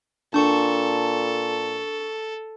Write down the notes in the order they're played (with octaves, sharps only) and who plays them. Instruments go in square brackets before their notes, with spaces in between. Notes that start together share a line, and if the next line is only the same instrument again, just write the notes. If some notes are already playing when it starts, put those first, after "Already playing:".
[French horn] A#2 [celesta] D4 [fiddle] A4 [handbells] A5 C#6